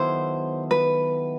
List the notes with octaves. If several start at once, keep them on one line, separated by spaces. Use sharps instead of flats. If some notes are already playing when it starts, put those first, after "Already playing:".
Already playing: D#3 F#3 B3 E4 A4 C5
B4